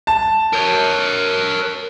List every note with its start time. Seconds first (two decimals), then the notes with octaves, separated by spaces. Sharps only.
0.07 A5
0.53 A#4 C#5